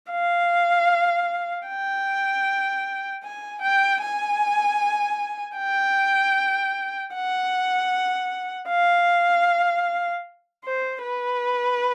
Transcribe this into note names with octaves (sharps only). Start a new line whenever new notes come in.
F5
G5
G#5
G5
G#5
G5
F#5
F5
C5
B4